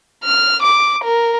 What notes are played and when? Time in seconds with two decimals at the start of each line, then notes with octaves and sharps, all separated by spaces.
0.24 F6
0.62 D6
1.04 A#4